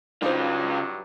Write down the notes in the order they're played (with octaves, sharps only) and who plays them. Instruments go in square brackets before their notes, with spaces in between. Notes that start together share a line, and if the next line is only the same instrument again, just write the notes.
[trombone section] G2 F#3 [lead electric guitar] C#3 F4 [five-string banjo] D4 D#4 C5